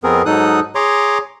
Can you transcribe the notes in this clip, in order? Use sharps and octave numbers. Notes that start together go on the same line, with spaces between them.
F2 B3 C4 G#4 A#4
G#2 F#3 D#4 A4 D#6 F#6
G#4 C#5 A#5 C6 D6